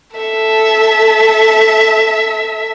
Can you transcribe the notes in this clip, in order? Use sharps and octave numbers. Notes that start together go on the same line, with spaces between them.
A4 E5